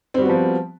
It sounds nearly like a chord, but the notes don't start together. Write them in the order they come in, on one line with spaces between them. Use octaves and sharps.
C4 G3 F#4 B3 F3